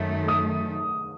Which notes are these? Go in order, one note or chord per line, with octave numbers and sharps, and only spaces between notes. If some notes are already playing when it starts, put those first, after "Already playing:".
Already playing: F#2 D#3 A3
D#6